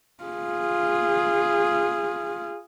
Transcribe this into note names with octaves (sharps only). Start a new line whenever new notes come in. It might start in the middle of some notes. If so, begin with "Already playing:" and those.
F4 G#4